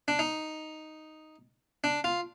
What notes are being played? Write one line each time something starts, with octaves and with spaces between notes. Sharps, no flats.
D4
D#4
D4
F4